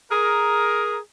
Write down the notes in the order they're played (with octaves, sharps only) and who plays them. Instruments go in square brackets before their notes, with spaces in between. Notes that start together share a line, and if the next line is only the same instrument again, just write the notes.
[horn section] G#4 A#4